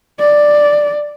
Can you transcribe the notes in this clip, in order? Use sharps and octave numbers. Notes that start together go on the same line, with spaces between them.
D5